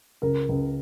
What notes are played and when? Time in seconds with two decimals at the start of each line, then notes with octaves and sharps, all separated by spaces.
0.22 C#2 A#4
0.49 C#2